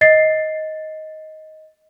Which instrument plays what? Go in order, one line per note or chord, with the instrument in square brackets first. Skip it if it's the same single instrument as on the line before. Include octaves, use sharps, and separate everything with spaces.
[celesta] D#5 A6 C7